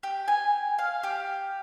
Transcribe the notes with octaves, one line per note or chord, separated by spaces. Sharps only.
G4
G#5
F5
G4